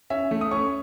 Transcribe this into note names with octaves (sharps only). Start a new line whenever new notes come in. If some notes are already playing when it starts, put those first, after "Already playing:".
C#4 E5
A3
D#6
C#4 C#6